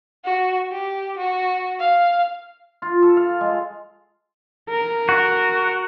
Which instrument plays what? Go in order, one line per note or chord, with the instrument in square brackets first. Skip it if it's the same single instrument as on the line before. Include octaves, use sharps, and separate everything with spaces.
[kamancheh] F#4
G4
F#4
F5
[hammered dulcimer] F4
A4
F5
G#3
[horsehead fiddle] A#4
[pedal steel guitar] F#4